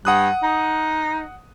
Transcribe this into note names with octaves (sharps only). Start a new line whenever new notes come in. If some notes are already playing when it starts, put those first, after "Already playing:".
G2 F#5 D#6 F#6
D#4